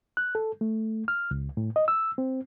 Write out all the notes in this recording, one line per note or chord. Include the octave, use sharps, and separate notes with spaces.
F#6
A4
A3
F6
C#2
A2
D#5
E6
C4